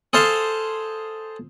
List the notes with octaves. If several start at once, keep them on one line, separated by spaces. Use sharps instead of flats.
G#4 A4 C5 F5 A5 C6